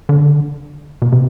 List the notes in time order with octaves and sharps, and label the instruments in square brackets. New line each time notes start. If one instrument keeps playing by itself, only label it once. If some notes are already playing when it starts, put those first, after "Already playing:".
[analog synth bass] D3
B2
C3